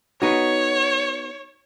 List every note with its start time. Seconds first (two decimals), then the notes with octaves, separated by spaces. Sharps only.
0.22 B3 D#4 F#4 C#5